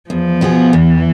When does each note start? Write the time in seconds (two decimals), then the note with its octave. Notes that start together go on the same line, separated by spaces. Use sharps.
0.10 E2 F3
0.41 B2 B3 F4 G#4
0.73 E2 E3